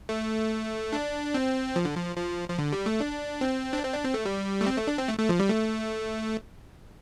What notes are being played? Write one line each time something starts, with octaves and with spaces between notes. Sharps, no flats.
A3
D4
C4
F3
D3
F3
F3
F3
D3
G3
A3
D4
C4
D4
C4
D4
C4
A3
G3
A3
C4
A3
D4
C4
A3
A3
F3
G3
A3